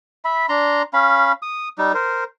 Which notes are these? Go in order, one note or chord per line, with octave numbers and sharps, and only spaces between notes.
E5 B5
D4 A#5 C6
C#4 F5 B5
D#6
G3 D#4
A#4 C5